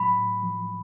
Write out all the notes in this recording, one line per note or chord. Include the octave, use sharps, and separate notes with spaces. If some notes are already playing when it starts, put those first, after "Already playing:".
Already playing: A2 F#3 B5
A2
F3